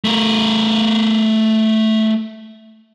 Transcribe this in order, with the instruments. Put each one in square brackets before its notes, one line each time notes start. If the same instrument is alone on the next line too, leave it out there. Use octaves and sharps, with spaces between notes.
[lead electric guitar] A3 A#4